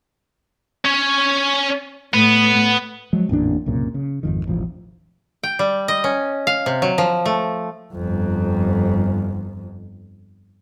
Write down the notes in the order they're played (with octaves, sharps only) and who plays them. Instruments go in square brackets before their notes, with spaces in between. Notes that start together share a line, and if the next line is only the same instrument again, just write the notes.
[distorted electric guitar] C#4 C#5
[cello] A2 [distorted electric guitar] B3
[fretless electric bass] F3 F#3 G#3
A1 F2 A#2 D4
C2 F#2 A#2 C#3
C#3
G#1 F2 D#3
E1 A1 F3
[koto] G5
G3
D#5
C#4
F5
C3
F#3
F3
A3
[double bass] G1 F2